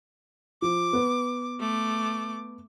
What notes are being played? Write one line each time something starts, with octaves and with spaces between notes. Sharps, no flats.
F3 D6
B3 B4
A3 D6